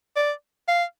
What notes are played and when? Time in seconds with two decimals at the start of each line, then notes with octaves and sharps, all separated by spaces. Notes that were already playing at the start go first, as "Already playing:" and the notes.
0.16 D5
0.68 F5